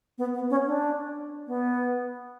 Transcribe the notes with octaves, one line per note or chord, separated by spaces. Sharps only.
B3
B3
C#4
D4
B3